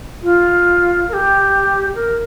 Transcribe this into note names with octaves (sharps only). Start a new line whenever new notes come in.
F4
A#4
G4
A#4